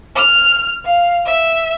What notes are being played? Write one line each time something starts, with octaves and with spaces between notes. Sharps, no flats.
F6
F5
E5